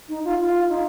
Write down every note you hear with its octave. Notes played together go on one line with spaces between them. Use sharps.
D#4
F4
F4
D#4